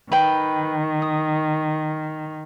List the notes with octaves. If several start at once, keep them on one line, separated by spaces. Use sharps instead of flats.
D#3 B4 G5
D#6